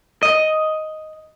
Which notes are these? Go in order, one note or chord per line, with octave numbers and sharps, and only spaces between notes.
D#5